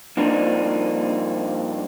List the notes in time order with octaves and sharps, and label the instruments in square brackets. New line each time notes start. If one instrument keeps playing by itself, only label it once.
[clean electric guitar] G2 F3 A#3 C4 D4 D#4